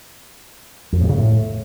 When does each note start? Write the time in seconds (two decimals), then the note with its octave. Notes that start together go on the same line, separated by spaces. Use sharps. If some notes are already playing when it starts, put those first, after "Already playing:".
0.93 F2
1.01 A2
1.09 C#3
1.18 A2